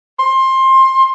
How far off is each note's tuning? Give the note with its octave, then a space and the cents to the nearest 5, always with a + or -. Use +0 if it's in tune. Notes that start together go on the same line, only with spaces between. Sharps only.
C6 +20